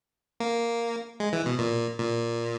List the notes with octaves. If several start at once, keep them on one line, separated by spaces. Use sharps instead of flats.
A#3
G#3
E3
B2
A#2
A#2